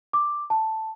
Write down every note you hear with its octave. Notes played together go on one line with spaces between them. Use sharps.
D6
A5